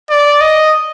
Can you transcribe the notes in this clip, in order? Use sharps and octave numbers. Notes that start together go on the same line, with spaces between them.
D5
D#5